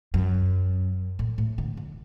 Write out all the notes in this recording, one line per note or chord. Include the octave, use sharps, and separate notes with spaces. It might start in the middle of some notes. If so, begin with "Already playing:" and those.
F#2
A2
A2
D3
D3